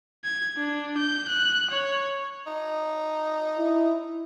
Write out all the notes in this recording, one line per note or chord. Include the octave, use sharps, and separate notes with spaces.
G#6
D4
G6
F#6
C#5
D#4
E4